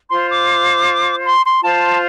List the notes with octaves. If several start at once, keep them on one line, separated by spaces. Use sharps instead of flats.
F4 C5 C6
D6
C6
C6
F4 C5 A5